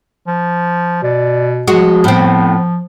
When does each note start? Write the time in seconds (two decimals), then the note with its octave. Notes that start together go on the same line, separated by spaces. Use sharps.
0.27 F3
1.03 B2 D5
1.68 F3 G#3 F#4
2.04 A2 B3 C4